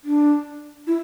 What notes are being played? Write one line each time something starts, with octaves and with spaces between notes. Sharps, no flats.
D4
E4